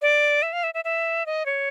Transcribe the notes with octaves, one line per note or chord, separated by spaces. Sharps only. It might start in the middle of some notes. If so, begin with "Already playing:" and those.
D5
E5
F5
E5
E5
E5
D#5
C#5